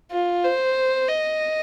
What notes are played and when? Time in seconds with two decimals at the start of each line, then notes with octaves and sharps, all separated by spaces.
0.12 F4
0.44 C5
1.08 D#5